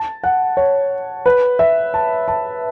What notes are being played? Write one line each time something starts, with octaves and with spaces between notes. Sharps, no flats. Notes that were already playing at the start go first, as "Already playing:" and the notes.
Already playing: A5
F#5
C#5
B4
E5
A5
A5